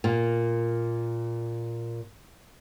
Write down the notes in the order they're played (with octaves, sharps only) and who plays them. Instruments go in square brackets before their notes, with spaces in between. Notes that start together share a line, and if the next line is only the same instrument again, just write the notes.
[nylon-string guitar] A#2 A#3